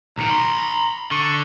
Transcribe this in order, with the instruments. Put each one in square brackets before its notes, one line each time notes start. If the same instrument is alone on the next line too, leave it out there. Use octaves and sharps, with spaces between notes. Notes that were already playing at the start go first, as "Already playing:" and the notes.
[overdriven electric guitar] B1 D#3 [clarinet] A#5
[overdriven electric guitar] B5 C6
[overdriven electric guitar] D3 [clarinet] C#6